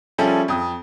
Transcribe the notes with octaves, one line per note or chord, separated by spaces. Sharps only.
F3 G3 C#4 G#4 A4 E5
F2 D#6